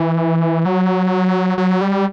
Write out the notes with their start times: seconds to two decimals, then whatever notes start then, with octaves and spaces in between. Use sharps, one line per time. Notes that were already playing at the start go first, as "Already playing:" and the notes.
Already playing: E3
0.65 F#3
1.58 F#3
1.81 G3